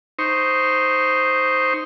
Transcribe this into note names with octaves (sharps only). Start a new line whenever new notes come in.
D#4 C5 C#6